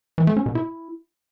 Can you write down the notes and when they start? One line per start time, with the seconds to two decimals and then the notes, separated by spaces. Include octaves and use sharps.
0.18 E3
0.27 A3
0.37 C#4
0.46 B2
0.55 E4